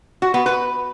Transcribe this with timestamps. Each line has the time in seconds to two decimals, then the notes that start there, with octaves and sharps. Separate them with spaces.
0.22 F#4
0.34 B3
0.46 B4